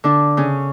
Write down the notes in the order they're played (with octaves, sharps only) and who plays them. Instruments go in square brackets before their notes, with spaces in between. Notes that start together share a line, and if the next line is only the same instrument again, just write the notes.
[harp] D3 D4
C#3 C#4